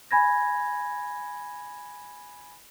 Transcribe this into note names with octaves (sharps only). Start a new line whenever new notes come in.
G#5 B5 G#6 A#6